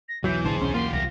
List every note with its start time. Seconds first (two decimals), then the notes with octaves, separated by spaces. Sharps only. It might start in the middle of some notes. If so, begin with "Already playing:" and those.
0.09 A#6
0.24 B1 E2 E3 F#3 G6
0.45 A1 D3 E3 G#4 C5 A5
0.60 C2 C#4 C6
0.74 A#3 F4 G4 C6
0.93 C2 A#6